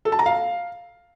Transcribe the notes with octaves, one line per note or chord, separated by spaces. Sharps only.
A4
A5
A#5
F5